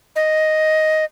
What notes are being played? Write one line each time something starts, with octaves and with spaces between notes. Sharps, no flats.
D#5